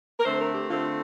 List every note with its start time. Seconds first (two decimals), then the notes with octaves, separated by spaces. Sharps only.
0.20 A#4
0.25 D3 A3 C4 C5
0.40 A#4
0.55 G4
0.70 D3 A3 C4 F4